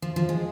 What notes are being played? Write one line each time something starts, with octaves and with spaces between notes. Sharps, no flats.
F3
F3
G#3